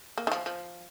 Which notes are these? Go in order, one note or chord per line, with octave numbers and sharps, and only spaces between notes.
A#3
D#3
F3
F3